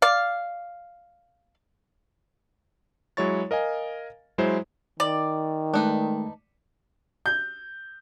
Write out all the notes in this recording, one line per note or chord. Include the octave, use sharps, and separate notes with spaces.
D5 F5
F#3 G#3 E4 C#5 C#6 A6
A#4 D#5 F5 G#5
F#3 G#3 E4 C5
D#3 D5
G#3 A3 D4 D#4 B4
G6